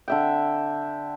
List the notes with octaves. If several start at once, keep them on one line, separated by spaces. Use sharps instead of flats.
D3 E5 G5